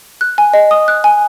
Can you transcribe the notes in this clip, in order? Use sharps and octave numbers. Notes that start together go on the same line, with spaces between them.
F#6
G#5
D#5
D#6
F#6
G#5